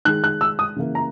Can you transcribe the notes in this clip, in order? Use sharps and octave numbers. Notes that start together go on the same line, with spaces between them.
D#3 G#3 F#6
F#6
E6
D#6
C#3 E3 A#3
A#5